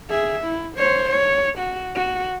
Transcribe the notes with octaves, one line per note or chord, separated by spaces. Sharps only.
G#4 E5
E4
C5 C#5
C#5
F#4
F#4